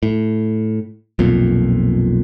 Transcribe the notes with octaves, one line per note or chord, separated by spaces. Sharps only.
A2
B1 F2 A#2